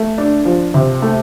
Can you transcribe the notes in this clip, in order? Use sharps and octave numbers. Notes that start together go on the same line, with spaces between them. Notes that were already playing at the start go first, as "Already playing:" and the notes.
Already playing: A3
D4
F3
C3
A3